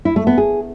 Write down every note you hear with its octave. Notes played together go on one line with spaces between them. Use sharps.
E4
A3
B3
G#4